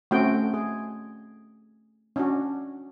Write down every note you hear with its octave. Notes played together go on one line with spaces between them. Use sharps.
A3 C4 C#4 F#4 G5
G#4
C#4 D4 F#4